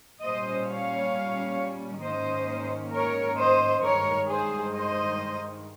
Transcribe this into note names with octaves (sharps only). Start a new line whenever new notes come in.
A#2 G3 C#4 C5 D#5
C#5 F5
G#2 D#3 A#3 C#4 C5 D#5
A#4 C#5
C5 D#5
G2 D#3 G#3 A#4 C#5
G#4 C5
C5 D#5